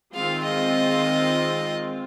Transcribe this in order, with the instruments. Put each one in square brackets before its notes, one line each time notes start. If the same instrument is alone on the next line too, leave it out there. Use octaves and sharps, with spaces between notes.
[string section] D#3 G#3 C4 F4 [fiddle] F5
[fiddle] D#5